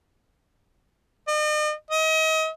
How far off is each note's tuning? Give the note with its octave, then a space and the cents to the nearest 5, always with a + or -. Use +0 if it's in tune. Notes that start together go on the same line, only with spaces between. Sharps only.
D#5 -45
D#5 +35